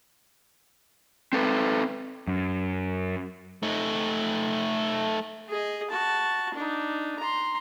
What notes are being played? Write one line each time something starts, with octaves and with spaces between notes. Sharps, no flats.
C4 A4 B4
F#2
A3 D#4
G#4 D#5
F#4 A5
D4 D#4
A#5 C6